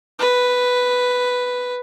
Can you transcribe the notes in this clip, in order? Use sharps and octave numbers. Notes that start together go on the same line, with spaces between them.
B4